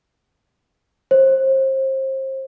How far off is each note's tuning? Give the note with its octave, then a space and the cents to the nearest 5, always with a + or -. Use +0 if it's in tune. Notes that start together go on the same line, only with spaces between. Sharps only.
C5 +30